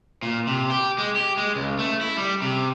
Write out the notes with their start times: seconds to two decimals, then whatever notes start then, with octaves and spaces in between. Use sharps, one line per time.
0.23 A#2
0.47 C3
0.71 G4
0.98 G#3
1.16 G4
1.38 G#3
1.56 C#2
1.79 A3
2.01 E4
2.17 G3
2.42 C3